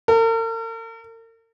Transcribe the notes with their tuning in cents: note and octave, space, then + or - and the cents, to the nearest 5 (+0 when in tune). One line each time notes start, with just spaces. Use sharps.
A#4 -45